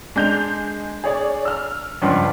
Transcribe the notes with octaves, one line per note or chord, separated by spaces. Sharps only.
G#3 D4 G6 F7
G#4 C#5 D5
E6 F6
C#2 G2 F3